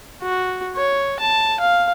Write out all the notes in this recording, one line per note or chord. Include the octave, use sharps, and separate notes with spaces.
F#4
C#5
A5
F5